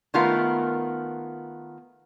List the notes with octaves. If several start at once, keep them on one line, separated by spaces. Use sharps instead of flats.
D#3 A3 B3 F4 A#4 F5